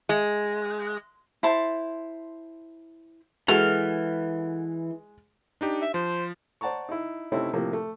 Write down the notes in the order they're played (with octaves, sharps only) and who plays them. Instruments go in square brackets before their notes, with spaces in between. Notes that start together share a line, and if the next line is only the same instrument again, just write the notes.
[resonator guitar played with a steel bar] G#3
[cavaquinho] E4 C5 A5 C6
[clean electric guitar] E3 [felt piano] G#3 [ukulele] F#4 A4 [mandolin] F6
[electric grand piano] D4 D#4 G4
[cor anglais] E5
[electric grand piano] F3 [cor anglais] C5
[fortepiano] C5 D5 F#5 A5 A#5 C#6
D#4 E4
C3 A3 C4 C#4 D#4 E4
A2 C3 F3 A#3
A3